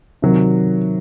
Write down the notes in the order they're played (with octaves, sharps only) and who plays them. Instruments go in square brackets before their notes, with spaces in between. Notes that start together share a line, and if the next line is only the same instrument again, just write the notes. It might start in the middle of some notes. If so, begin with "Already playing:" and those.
[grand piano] C3 D#3 F#3